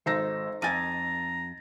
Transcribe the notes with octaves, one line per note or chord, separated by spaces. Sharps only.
G#1 D#4 A4 C5 E6 A#6
F2 G#5 A#5 G#6 A6 D#7